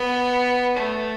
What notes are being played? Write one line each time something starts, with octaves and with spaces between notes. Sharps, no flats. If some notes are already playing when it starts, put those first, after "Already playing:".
Already playing: B3
A3